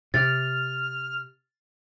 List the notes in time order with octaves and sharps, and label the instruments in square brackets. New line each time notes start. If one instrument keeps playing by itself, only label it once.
[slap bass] C3 [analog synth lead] F6 [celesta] A6